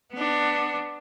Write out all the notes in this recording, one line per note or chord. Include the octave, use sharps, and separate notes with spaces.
B3 D4